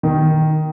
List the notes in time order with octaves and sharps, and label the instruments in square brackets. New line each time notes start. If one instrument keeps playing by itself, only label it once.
[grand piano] D#3